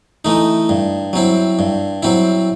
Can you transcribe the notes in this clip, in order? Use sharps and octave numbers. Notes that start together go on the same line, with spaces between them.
E3 A3 D#4
G2
F#3 C4 E4
G2
F#3 C4 E4